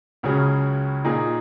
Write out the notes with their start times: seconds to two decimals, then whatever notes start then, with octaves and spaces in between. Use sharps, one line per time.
0.23 C#2 C#3 F#3 C#4 G#4
1.04 A#2 A#3 D#4 G#4